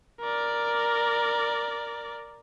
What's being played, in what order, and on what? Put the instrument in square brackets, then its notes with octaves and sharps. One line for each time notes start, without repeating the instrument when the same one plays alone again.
[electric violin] A#4 D5